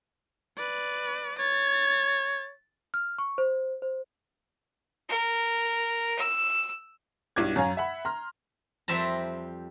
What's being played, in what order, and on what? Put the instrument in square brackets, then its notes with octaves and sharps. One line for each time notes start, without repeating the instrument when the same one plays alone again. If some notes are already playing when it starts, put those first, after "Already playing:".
[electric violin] B4 D5
[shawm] C#5 [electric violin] A6
[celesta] F6
C#6
C5
C5
[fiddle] A#4
E6
[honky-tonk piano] B1 G2 E4 D6 G#6
F#2 C#5 F5 G#5 A#5
E5 F#5 B5
A#5 C6 F6
[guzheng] F2 G3 C4 E5 A5 A#5